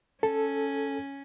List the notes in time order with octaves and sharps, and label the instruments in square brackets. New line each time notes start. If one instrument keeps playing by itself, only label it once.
[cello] C#4 [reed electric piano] A4